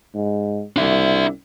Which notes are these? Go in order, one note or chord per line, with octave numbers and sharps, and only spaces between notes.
G#2
C2 D4 E5